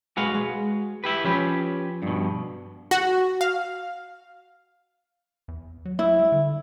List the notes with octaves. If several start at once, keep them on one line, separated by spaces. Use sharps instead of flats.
B1 G#3 F#4 B4 F5 G#5
G#3
E4 G4 B4
F3 C#4 G4 B4
G2 B2
F#4
F5
E2
F#3
E4
G3
D3